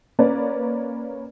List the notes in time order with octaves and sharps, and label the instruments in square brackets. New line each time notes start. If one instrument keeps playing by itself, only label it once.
[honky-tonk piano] A#3 C#4 B4 D5